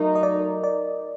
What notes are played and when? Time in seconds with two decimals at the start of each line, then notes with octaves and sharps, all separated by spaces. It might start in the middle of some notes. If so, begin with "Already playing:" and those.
Already playing: F#3 A3 D#4 A#4
0.16 D#5
0.23 D5
0.64 D5